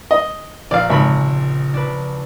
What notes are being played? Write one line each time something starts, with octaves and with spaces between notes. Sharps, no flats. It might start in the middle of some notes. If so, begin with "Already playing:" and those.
D#5
A#1 D5 F5
G#1 C#3 B5
D4 B4